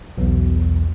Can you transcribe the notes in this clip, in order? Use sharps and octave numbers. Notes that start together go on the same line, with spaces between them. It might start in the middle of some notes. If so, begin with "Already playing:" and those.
B1 E2